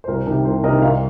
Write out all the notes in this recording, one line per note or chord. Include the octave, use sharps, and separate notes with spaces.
C5
C2 A#4
C3 D#3
C2 C5
C3 D#3 A#4 D#5
C2 C5 F5